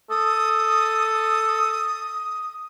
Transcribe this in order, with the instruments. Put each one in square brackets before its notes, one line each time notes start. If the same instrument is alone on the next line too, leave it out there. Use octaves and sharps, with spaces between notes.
[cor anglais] A4 [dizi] D#6